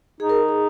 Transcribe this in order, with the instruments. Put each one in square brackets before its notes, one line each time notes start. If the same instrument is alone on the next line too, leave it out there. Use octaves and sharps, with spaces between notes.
[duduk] D#4 [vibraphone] G#4
[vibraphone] A#4
G#4